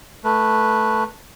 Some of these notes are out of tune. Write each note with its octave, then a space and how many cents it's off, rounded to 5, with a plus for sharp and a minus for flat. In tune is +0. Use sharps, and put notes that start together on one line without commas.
A3 +0 B4 -10